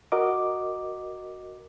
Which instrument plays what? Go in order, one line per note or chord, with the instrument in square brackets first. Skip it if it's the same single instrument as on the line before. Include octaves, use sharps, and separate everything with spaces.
[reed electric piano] F#4 A#4 D#5 D6